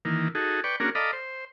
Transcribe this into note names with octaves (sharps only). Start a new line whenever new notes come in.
D#3 E3 A#3
D#4 F#4 G#4 A4
B4 D5 G5 C#6
A#3 C#4 D4 F#4 G#4 A#4
A4 D5 D#5 F5 A#5 B5
C5